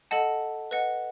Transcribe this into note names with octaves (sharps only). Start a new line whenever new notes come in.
A4 D#5 F#5 A5
B4 D#5 F#5